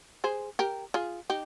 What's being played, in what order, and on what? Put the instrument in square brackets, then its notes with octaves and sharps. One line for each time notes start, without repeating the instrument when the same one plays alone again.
[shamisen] G#4 C5
G4 A#4
F4 G#4
D#4 G4